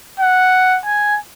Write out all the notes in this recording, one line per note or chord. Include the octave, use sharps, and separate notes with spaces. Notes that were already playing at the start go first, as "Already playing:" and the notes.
F#5
G#5